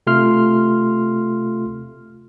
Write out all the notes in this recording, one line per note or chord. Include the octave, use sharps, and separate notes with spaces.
C3 A3 F4 C6 F6